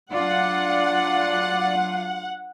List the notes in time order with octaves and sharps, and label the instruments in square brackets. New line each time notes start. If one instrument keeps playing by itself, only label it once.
[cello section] F#3 D4 F4 [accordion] D5 [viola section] F#5